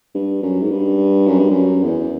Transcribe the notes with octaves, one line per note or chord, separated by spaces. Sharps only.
G2
F#2
G#2
G2
F#2
G2
F#2
E2